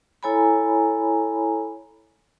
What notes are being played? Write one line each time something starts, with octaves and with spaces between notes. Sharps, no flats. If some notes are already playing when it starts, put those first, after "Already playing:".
E4 A4 C#5 G#5 A#5 B5